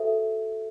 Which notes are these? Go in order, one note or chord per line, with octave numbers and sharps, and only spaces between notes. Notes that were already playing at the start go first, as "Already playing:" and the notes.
Already playing: F#4 A4 C5 E5